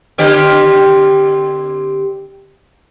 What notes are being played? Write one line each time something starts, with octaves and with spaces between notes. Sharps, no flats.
D3 C4 G4